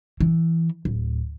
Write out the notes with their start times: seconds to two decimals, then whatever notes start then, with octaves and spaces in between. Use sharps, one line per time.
0.20 E3
0.85 D1